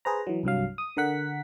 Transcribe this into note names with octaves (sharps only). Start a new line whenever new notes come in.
G#4 B4 C5 A#5
E3 F#3
C2 G2 F#3 F5
D#6
D3 A#4 F#5 B6